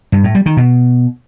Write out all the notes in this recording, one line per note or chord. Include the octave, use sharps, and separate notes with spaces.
G2
A2
G3
D#3
B2